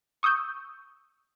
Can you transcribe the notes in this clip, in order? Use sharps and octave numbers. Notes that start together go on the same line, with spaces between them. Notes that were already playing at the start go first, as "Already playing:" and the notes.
C#6 D#6 E6 G6